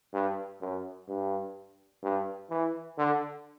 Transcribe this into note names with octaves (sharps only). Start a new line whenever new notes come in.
G2
F#2
G2
G2
E3
D3